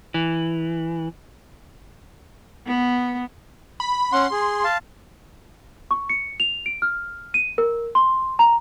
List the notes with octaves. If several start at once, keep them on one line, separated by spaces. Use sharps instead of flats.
E3
B3
B5
C#4 F#5 C6
G#4
F5 A5
C#6
C#7
F7
D7
F6
D#7
A#4
C6
A#5